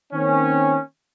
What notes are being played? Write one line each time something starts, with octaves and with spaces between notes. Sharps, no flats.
D#3 A#3 C4 C#4